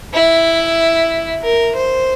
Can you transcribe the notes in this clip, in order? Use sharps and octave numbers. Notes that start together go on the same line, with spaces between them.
E4
A#4
C5